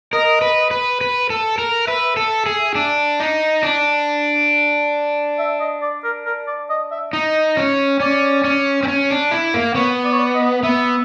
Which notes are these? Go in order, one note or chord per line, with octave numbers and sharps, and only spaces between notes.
A#4 D#5
B4
B4
B4
A4
A#4
B4 E5
A4
G#4
D4
D#4
D4
E5
D#5
D5
A#4
A#4
D5
D#5
E5
D#4 D#5
C#4
C#4 D5
C#4
C4
C#4
D4
E4
A#3
B3 C#5
D5
C#5
D5
D#5
B3 E5